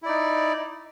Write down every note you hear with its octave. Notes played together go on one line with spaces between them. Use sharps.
D#4 E4 D5